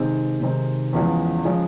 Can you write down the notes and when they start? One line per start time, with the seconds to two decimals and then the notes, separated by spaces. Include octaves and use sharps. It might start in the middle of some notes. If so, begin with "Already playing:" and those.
Already playing: C3 D#3 G#3 C4 D#4
0.40 C3 D#3 G#3 C4 D#4
0.93 E2 C#3 F3 G#3
1.44 C#3 F3 G#3